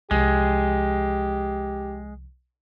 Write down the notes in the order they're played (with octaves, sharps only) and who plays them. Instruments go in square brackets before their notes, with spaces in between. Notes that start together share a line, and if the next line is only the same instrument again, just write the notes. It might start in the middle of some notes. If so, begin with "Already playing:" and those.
[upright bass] C2 F3 [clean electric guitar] G#3 [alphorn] G4